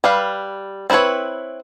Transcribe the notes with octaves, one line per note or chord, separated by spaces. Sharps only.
G3 B4 F5
C4 E4 F#4 B4 C#5